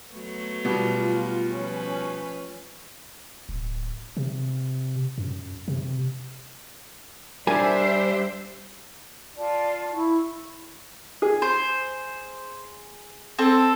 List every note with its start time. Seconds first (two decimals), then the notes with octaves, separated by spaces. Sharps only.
0.10 F#3 A3 B3
0.65 B2 G3 F4
1.54 F3 C#4 B4
3.49 D1
4.17 C3
5.18 F#2
5.68 C3
7.47 G3 D4 A#4 C5 E5 G#5
9.37 F4 D5 A5
9.92 E4 C#6
11.22 G#4
11.42 C5
13.38 C4 A4